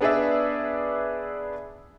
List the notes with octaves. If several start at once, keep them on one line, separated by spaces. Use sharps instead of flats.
B3 D4 G#4 B4 D5 E5